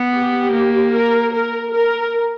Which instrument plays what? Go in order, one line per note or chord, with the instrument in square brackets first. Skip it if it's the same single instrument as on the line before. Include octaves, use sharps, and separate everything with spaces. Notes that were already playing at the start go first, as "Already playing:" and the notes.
Already playing: [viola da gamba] B3
[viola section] G4
[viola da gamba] A#3
[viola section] A#4
A#4
A#4